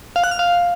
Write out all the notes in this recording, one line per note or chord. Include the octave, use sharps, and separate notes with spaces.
F5
F#6
F6
F5